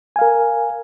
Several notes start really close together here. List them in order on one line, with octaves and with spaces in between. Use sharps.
G#5 F5 A#4